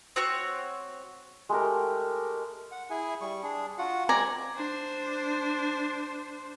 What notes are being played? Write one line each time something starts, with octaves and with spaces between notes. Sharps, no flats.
C4 F#4 C#5
G#3 A3 G4 A#4
F#5
E4 G#4 G#5
G3 C#6
D4 G#4
F4 F#4 F#5
G#3 C4 D5 G#5 A#5
D4 C5